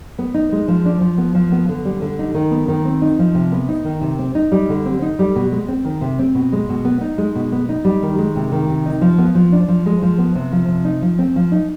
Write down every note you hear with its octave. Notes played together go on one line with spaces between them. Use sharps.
B3
D#4
G#3
F3
D4
F3
B3
F3
B3
D3
G3
D3
D#4
D#3
B3
D#3
C4
D#4
F3
C3
B3
D#4
D#3
C3
C4
D#4
G3
D3
C4
D#4
G3
B2
G#3
C4
D#3
C3
C4
B2
G#3
B2
B3
D#4
G#3
B2
B3
D#4
G3
D#3
G#3
C3
D#3
C3
D#4
F3
B3
F3
D4
F3
G#3
F3
B3
C3
F3
C3
D#4
F3
C4
F3
D#4